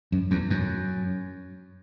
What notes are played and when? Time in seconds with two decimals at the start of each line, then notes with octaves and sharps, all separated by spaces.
0.12 F#2
0.31 E2
0.50 F#2